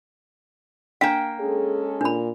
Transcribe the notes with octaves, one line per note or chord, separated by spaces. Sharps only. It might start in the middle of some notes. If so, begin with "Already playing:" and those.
A#3 D4 F5 G5
G#3 C#4 G#4 A4
A#2 D4 B5